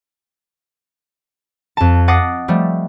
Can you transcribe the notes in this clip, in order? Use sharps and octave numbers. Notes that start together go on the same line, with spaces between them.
F2 A5
D#5 F#5 D6 D#6 A6 C7
F3 G3 A3